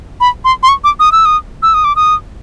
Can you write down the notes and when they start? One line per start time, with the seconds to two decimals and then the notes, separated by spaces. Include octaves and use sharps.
0.21 B5
0.45 C6
0.63 C6
0.69 C#6
0.84 D6
1.00 D#6
1.12 E6
1.25 D#6
1.63 E6
1.74 D#6
1.84 D6
1.96 D#6